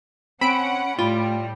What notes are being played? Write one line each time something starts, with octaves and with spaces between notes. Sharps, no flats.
C4 C#4 F#5 B5 D7
A2 G3 F4